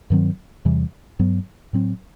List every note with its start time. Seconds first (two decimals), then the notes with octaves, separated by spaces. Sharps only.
0.10 G2 D#3 F#3 C4
0.65 E2 C3 E3 G3
1.19 G2 F#3 B3
1.73 A2 F#3 C4